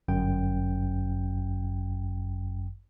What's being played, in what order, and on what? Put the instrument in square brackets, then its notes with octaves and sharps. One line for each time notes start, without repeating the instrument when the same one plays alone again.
[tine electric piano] G1 F#2 G5